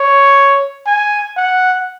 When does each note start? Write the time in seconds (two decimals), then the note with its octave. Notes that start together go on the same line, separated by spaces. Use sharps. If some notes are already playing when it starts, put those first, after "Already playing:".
Already playing: C#5
0.86 G#5
1.37 F#5